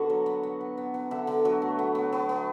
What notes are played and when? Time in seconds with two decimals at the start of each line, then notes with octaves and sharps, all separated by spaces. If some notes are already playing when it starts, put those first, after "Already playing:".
Already playing: D3 B3 F#4
0.10 F#3
0.26 B3
0.43 B3
0.61 B3
0.78 B3
0.94 B3
1.11 D3 E5
1.27 D3
1.45 F#3
1.62 A3
1.79 B3
1.95 B3
2.13 B3
2.29 B3